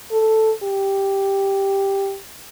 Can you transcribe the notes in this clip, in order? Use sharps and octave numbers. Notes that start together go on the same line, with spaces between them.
A4
G4